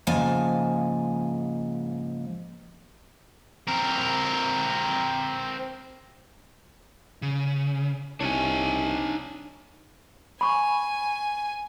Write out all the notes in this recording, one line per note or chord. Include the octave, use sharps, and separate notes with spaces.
G#2 C#3 F3 A#3 G#5 A5
C4 A#4
C#3
C2 D4 D#4 C#5 G#5
G#5 B5 C#6